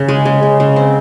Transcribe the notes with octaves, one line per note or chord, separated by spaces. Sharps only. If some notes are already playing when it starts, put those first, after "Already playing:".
Already playing: C#3
G#3
C#3
C#3
C#3
C4